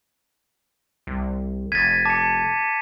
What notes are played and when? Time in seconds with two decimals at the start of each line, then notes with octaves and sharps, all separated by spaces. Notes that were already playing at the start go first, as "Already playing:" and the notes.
1.07 C2
1.72 F1 G#6 A6 B6 D#7
2.05 A5 D6 C#7